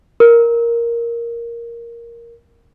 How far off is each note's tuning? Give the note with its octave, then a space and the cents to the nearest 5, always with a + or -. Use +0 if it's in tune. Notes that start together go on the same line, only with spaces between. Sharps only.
A#4 +5